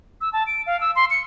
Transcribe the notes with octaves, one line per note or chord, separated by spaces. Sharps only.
E6
A5
D7
F5
E6
C6
C#7